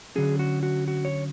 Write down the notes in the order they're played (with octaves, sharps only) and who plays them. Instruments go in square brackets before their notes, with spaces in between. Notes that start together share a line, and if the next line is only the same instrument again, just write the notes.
[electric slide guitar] D3 F#3 C#4 G#4
F#4
F#4
F#4
C#5